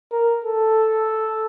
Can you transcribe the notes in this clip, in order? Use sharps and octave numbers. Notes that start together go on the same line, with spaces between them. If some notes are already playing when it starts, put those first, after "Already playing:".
A#4
A4